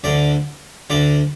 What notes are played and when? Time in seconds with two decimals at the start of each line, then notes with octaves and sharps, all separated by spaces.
0.04 D2 D3 D5
0.90 D2 D3 D5